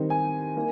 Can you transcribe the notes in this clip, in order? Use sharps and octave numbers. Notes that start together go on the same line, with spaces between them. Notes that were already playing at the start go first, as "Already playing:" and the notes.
Already playing: D#3 G3 C4 D#4
G#5
A#3 D#4